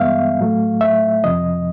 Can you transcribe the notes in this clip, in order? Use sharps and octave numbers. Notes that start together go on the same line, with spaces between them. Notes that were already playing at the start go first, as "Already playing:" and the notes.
Already playing: G2 E3 G#3 B3 E5 F5
A2 F#3 A3
E5
F2 C3 F3 D#5